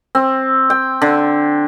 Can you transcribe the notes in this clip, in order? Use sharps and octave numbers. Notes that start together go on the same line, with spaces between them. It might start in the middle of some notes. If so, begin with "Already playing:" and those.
C4
G5
D3